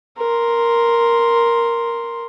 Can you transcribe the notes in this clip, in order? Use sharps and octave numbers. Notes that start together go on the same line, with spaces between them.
A#4 C6